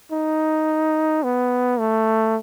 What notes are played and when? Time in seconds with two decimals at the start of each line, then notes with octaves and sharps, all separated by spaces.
0.12 D#4
1.23 B3
1.79 A3